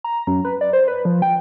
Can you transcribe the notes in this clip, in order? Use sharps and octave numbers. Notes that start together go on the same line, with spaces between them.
A#5
F#2
B4
D5
C5
B4
F3
G5